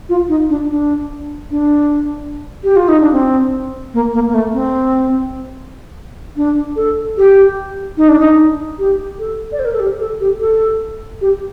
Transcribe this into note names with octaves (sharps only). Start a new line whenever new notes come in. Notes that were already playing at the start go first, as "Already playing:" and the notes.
F4
D#4
D4
D4
D4
G4
F4
D#4
D4
C4
A#3
A#3
A#3
A3
C4
D4
A4
G4
D#4
D4
D#4
G4
A4
D5
C5
A#4
A4
G4
A4
G4
A4
G4